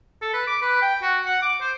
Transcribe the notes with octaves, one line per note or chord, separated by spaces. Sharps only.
A4
B4
D6
B4
G5
F#4
F#5
D6
C5